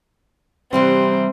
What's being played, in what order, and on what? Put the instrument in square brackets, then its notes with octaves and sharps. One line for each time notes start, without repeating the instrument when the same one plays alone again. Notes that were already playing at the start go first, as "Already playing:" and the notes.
[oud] C3 E3 G3 [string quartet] C4